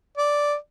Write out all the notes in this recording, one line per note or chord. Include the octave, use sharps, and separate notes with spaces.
D5